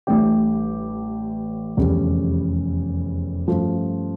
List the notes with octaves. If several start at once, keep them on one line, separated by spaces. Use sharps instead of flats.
A1 A2 G3 D4 G4
F1 E2 D3 G3 C#4
G2 F3 A3 C#4 F4